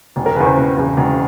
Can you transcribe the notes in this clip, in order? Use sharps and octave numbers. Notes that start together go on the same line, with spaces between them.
E1
A#4
E2 C#3 B4
C5
E1 B4
E2 C#3
E1